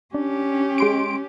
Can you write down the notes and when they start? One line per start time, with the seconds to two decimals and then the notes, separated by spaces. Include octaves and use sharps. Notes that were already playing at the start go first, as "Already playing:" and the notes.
0.14 C#4 D4 G4
0.78 G#3 C6 D7